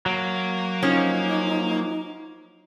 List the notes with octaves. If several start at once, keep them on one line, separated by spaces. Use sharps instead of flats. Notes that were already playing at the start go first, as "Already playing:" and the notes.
F#3 A#3
F3 C#4 D#4